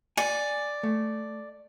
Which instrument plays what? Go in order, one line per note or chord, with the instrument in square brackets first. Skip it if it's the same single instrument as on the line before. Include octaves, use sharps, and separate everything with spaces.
[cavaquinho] D5 [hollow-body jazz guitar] G#5
[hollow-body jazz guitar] A3